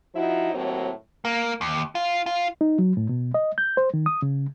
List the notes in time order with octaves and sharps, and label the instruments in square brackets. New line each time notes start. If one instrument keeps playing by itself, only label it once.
[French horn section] F3 D#4 E4 F#4
D#2 A2 F#3 C4
[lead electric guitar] A#3
D#2
F4
F4
[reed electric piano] D#4
F#3
A2
B2
D#5
G6
C5
D#3
D#6
C#3